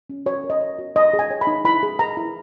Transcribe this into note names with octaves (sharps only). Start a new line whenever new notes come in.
C#4
F#4 C#5
A#4
D#5
C#5
F#4
D#4 D#5
G#4
G#5
C#5
B5
D#4
E4 B5
G#4
B4 A#5
E4